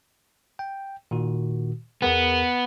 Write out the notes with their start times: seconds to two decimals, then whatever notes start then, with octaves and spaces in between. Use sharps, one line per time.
0.59 G5
1.11 A#2 D#3 F#4
2.02 E2 B3 G#4 A#4